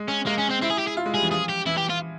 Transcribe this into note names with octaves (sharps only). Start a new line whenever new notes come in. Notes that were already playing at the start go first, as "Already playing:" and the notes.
Already playing: G#3
C#4
G#3 A#3
C#4
C4
C4 E4
G#4
G4
G#4
F4
G#3
G3 G#4
E3
F3 G#4
G4
E3 E4
G4
F4